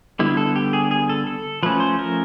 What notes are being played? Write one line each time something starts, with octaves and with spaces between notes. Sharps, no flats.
D3 G3 B3 E4
A4
G4
G#4
G#4
A4
A4
F3 A3 C#4 B4
C5
A#4